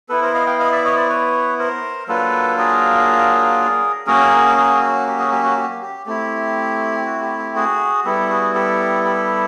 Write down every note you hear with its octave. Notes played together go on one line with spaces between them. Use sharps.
B3 E4 A4 B4
A#4 C5
D#5 F5
F5 G5
D#5 F5
D5 E5
C#5 D#5
C5 D5
B4 C#5
A#4 C5
F#3 A#3 D4 F4 A4 B4
G#4 A#4
F#3 A#3 C#4 F#4 G#4 A#4
F#4 G#4
F#4
G4
F#4 G#4
G4
F#4
G4
G4
A3 C4 E4 G4
F#4
G4
G4
F#4 G#4
G3 B3 E4 G4 A4
F#4 G#4
G4 A4
G4 A4